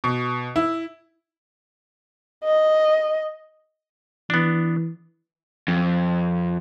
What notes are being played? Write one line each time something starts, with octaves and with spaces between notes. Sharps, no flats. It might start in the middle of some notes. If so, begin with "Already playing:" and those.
B2
E4
D#5
E3 B3 D4
F2